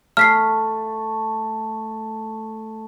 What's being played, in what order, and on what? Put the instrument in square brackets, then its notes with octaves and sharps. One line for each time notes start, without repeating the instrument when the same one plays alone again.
[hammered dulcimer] A3 [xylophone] F6 B6 C7